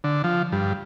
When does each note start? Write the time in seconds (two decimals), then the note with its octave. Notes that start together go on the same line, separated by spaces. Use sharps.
0.04 D3
0.24 F3
0.52 G2